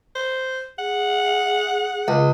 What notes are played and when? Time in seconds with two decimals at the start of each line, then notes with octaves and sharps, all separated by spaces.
0.15 C5
0.79 G#4 F#5
2.08 C#2